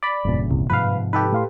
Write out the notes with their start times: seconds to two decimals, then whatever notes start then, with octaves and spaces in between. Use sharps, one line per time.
0.03 D5 B5
0.25 F1 E2 G2 A#2 C#3
0.51 C2
0.70 G#2 C3 F3 B4 F5
1.13 D#4 G4 A4 B4
1.33 A2 F5 C6